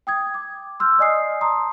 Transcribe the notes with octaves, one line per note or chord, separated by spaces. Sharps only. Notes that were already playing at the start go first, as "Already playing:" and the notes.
G5 D#6 G#6
D6
C6 E6 F6 G6
D5 D#5 G#5 D#6 C7
A5 A#5 C6 D#6